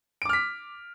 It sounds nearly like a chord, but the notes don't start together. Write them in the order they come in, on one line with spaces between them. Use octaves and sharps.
D7 D6 F6 B6